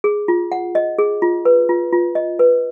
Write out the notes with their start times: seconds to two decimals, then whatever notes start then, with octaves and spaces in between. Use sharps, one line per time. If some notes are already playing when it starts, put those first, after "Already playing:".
0.04 G#4
0.28 F4
0.52 F#5
0.75 D#5
0.99 G#4
1.22 F4
1.45 B4
1.69 F4
1.93 F4
2.15 D#5
2.39 B4